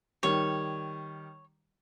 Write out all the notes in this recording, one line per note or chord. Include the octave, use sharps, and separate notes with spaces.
D#3 G3 C#5